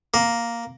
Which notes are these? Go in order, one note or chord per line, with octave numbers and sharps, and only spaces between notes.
A#3